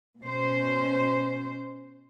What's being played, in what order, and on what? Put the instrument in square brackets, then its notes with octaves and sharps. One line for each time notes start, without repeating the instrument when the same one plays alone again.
[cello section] B2 C#4 C5